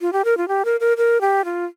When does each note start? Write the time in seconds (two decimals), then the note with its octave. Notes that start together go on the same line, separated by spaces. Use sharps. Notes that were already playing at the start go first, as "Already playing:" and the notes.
0.01 F4
0.13 G4
0.25 A#4
0.37 F4
0.48 G4
0.65 A#4
0.80 A#4
0.97 A#4
1.21 G4
1.45 F4